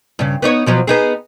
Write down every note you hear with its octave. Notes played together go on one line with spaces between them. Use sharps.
G2 C#3
B3 D#4 C#5
B2 F3 F#3
B3 D#4 G#4